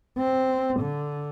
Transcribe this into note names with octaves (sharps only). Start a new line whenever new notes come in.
C4
D3